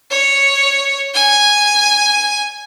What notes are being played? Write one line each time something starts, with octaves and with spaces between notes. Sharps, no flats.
C#5
G#5